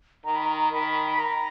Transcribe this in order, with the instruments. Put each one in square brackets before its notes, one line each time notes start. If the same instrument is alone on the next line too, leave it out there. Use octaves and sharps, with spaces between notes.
[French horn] D#3 [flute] A#5
[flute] B5
A#5
[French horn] D#3 [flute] B5
[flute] B5
A#5